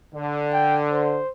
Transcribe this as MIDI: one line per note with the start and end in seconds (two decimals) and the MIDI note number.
0.13 1.20 50
0.53 0.77 79
0.92 1.31 72